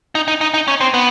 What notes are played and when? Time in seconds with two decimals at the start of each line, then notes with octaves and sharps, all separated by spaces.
0.15 D#4
0.28 D#4
0.41 D#4
0.54 D#4
0.68 C#4
0.81 C4
0.94 B3